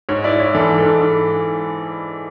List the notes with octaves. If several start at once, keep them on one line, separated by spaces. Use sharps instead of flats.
G#2 C#5
E4 D5
E4 C#5
E3 A4
G#2
A4
G#2
G#2